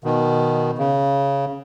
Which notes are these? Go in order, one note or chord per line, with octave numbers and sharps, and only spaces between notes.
B2 D#3
C#3